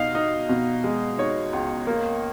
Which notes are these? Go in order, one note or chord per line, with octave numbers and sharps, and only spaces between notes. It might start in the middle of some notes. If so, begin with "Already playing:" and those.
Already playing: B2 D#4 F5
D#4
B2
G#3
D#4 C#5
C#2
A#3